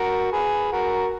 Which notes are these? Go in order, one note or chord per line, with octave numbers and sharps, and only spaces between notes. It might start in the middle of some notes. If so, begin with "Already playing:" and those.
Already playing: F#4 A#4
G#4 B4
F#4 A#4